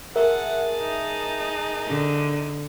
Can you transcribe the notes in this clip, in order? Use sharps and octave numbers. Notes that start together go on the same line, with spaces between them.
G#4 A#4 E5 F#5 A5
D#4
D3